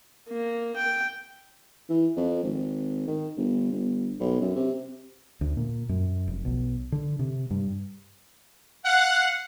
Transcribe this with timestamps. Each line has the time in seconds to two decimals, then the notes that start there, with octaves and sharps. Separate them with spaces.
0.28 A#3
0.76 G5
1.90 E3
2.16 F2
2.44 G#1
3.08 D#3
3.37 G1
3.72 G1
4.20 B1
4.41 F#2
4.56 C3
5.41 D2
5.57 A#2
5.89 F#2
6.27 F1
6.45 B1
6.92 D3
7.19 C3
7.51 G2
8.85 F5 F#5